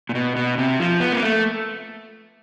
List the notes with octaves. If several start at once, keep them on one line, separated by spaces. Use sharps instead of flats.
A#2
B2
B2
C3
F3
B3
A#3
A3